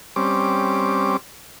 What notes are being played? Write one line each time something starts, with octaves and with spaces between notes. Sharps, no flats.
G3 C4 C#4 D6